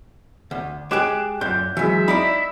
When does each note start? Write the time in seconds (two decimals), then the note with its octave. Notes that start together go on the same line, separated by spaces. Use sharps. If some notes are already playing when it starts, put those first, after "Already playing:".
0.51 D2
0.91 G#3 G4 G#4 D6 F#6 E7
1.41 F#2 A#2 G6
1.77 E3 F#3 G#3 E5 G#5
2.08 D#4 E4 D5 B5